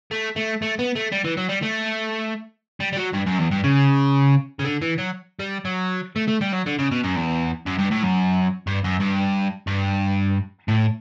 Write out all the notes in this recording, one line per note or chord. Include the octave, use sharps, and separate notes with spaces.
A3
A3
A3
B3
A3
G3
E3
F#3
G3
A3
G3
G3
F#3
G2
F#2
E2
G2
C#3
C#3
D3
E3
F#3
G3
F#3
A3
A3
G3
F#3
D3
C#3
B2
F#2
E2
F#2
G2
A2
F#2
G2
F#2
G2
G2
A2